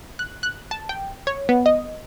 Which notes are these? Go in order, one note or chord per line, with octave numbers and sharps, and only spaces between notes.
F#6
F#6
A5
G5
C#5
B3
D#5